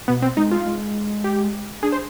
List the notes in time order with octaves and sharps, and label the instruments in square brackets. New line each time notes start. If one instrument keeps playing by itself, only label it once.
[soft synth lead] B2 [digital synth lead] B3
[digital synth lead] C4
[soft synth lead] G#3 [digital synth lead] D#4
[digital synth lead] F4
[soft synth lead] G#3
[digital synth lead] G4
[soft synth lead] D4 [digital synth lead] G#4
[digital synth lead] C5